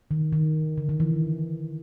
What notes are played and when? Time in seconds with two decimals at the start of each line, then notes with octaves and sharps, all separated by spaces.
0.11 D#3
0.33 D#3
0.78 D3
0.89 D#3
1.00 E3